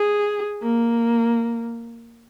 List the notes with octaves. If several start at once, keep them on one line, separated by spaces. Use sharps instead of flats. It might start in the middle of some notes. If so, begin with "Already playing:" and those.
Already playing: G#4
A#3